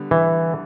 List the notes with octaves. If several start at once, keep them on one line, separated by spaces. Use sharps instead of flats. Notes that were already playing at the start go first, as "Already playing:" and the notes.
Already playing: D3 G3 B3
E3